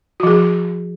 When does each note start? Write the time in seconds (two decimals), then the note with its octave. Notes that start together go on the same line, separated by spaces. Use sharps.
0.20 F#4
0.23 F3
0.27 G#4